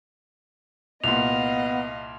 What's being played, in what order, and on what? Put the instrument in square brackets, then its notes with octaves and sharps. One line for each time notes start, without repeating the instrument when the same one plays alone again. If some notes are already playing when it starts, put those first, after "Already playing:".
[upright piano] C2 A#2 [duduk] B3 [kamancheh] D#5 F5 [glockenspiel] F7